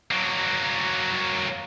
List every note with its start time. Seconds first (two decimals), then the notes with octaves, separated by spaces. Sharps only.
0.11 F#3 A#3